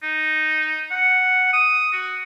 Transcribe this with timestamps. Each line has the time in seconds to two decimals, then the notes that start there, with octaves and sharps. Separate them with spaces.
0.03 D#4
0.91 F#5
1.53 D#6
1.93 F#4